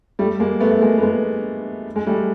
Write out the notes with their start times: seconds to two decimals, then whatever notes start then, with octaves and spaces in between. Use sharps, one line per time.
0.19 G3 A3
0.40 G#3 A#3
0.60 A3 B3
0.71 A3
0.81 G#3 A#3
0.98 B3
1.02 G#3 A#3
1.96 G#3
2.07 G3 A3